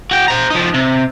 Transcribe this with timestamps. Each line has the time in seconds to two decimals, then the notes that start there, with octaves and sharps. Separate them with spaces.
0.11 F#4 G5
0.28 C5 A#5
0.50 F3 D#4
0.74 C3